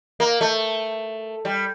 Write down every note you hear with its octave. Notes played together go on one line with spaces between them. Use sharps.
A#3
A3
G3